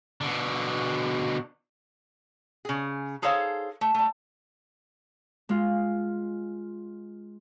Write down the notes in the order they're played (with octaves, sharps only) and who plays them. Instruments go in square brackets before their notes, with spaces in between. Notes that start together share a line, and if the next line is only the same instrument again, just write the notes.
[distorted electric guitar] B2 D3
[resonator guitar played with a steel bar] C#3 G#4
D#4 G#4 A4 C5 C#5 F5
A3
G3 A3
[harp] G#3 F4